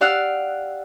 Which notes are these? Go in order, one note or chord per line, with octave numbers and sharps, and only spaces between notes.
G4 D5 F5 F#5 E6 F#6